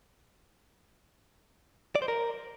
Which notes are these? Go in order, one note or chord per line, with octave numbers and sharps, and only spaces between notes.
D5
C5
A#4